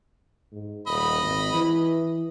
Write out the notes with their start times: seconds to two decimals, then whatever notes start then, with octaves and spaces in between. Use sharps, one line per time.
0.52 G#2
0.87 D#1 D#5 B5
1.22 G#1
1.54 E3